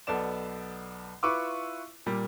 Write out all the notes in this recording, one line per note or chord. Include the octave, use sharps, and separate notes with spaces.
B1 B3 A4 D5 E7
E4 F4 B4 C#6 D6 E6
A#2 G3